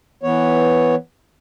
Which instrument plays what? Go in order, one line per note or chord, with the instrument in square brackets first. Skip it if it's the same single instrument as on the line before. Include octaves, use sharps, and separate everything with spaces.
[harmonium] E3 B3 C#5